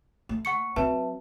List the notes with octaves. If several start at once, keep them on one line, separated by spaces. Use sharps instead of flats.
A3
F#5 C#6 C#7
F#3 C4 B4 E5 A5